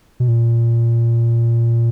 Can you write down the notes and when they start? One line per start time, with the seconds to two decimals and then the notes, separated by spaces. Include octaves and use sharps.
0.20 B2
0.28 A#2